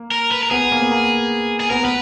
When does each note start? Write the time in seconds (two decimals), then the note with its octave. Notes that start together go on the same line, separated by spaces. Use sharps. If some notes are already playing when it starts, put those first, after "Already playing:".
Already playing: A#3
0.11 A#4
0.31 B4
0.43 A#4
0.51 B3 G#4
0.72 A#3
0.82 B3
0.91 A#3
1.60 G#4
1.70 B3 A#4
1.83 B3 B4